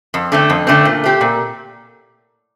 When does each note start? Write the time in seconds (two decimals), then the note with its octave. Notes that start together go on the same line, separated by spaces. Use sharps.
0.14 F2
0.32 D3 A3 C4
0.50 F2
0.67 D3 A3 C4
0.85 A#2
1.04 A3 C4 G4
1.21 A#2